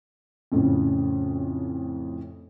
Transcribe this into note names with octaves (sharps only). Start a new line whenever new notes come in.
F2 A2 C#3